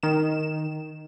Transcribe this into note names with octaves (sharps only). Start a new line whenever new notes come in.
D#3 E7